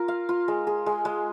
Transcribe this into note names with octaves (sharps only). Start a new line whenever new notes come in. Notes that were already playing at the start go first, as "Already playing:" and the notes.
Already playing: F4 A#4
F5
F4
G#3
G#4
G#3
G#3